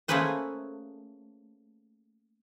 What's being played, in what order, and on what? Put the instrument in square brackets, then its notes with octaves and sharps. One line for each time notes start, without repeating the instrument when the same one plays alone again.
[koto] A3 A#3 C#4 G#4 B4 C5